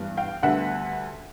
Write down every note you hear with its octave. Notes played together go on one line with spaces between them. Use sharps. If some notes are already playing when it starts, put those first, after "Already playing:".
Already playing: G2 E3 G3 B3
F5 G5
D2 D3 G3 B3 E5 F#5